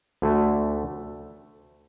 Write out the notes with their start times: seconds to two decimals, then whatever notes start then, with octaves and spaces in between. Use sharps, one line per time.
0.22 D2 D3 A3